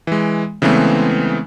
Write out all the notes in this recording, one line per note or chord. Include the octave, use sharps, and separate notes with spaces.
E3 G#3
C#3 E3 G#3 A3 B3 C4